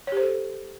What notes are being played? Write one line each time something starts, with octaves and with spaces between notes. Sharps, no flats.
G4 A4 C5 C#5